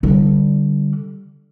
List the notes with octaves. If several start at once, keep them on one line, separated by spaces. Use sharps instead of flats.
D3 G3